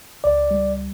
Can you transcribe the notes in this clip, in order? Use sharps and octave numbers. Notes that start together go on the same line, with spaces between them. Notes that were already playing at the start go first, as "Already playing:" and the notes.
C#2 D5
G3